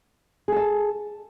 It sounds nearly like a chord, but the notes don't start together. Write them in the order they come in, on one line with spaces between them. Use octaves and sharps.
G#4 A4 A5